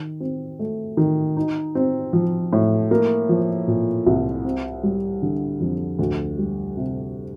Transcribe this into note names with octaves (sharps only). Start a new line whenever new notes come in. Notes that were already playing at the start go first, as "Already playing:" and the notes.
Already playing: D#3
C4
A3
D#3
D#4
C4
F3
A2
A#3
F3
A#2
C2
C4
G3
D3
F2
D2
G3
C3